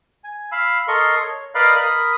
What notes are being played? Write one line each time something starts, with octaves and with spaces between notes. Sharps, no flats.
G#5
F5 B5 E6
A4 A#4 D#5 C6 C#6
C#5
A#4 B4 D5 D#5 F5 B5
A#4 B5 D#6